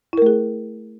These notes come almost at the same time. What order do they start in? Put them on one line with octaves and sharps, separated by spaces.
E4 A#4 A3 G#4